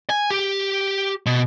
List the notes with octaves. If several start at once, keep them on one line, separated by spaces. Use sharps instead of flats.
G#5
G4
B2